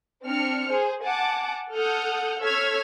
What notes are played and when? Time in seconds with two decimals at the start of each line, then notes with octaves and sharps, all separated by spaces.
0.24 C4 D4 F6 C#7
0.68 G#4 C5
1.04 F#5 G#5 A5 D6
1.74 A4 F#5 D#6 F6 G6
2.41 A4 C#5 E6 F6 G#6 B6